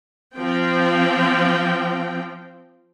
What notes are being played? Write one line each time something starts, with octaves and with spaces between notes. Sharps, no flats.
F3 C4 G5